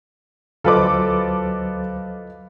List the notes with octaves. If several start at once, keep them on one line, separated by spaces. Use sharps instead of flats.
D2 F#3 F4 A4 B4 C5 D#5 D6